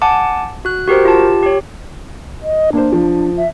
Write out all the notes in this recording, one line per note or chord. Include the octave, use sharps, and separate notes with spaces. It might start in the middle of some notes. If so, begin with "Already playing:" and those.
F#5 G#5 A5 D6
F#4 F#6
F#4 G4 A#4 C5
F4 G4 A5
G4 C#5
D#5
A#3 D4 C5
F3
E5